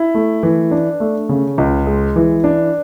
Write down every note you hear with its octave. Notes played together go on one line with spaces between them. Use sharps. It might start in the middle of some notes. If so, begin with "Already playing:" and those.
Already playing: E4
A3
E3
D4
A3
C#3
C#2
G#3
E3
D4